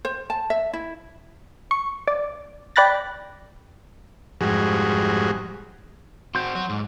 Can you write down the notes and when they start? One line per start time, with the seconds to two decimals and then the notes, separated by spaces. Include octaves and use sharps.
0.05 C5
0.30 A5
0.50 E5
0.73 E4
1.71 C#6
2.08 D5
2.76 D5 G5 B5 F#6 A6 A#6
4.41 F2 G#2 G3 F#4 G#4
6.35 C4 F#4 C6 G6
6.55 F#3 F#4
6.69 G#2